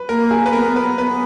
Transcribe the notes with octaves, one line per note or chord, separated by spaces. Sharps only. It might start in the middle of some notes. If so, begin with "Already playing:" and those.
Already playing: B4
A#3 A#4
G#4
B4
B3 A#4
B4
B3 B4